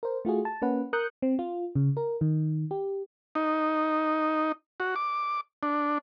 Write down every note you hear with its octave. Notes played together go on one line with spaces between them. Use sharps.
A#4 C5
A3 F4 F#4 G#4
A5
A#3 C#4 B4 F#5
A#4 D#6 F#6 G6 C#7
C4
F4
C#3
A#4
D#3
G4
D#4
F#4
D6
D4